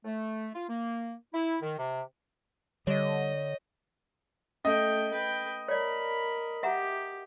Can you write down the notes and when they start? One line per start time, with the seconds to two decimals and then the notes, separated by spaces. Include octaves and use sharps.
0.05 A3
0.54 F4
0.69 A#3
1.33 E4
1.62 D#3
1.78 C3
2.87 D3 G3 C#5 D#5
4.65 A3 C#4 D#5 G5
5.11 B4 G5
5.68 A#4 C#5 D5 B5
6.63 G4 E5 F#5 A#5